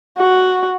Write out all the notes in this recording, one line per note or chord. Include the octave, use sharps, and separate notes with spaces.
F#4